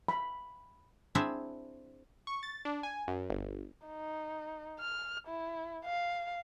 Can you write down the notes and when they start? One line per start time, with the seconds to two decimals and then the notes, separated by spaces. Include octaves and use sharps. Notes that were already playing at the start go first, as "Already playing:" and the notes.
0.08 B5
1.15 C4 D4 E4 G#4 C5 E5
2.27 C#6
2.43 A6
2.65 D4
2.83 G#5
3.08 F#2
3.29 G1
3.87 D#4
4.80 F6
5.28 E4
5.86 F5